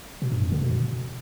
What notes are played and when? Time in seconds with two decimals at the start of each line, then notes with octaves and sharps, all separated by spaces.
0.22 B2
0.32 G2
0.42 F2
0.52 D3
0.62 B2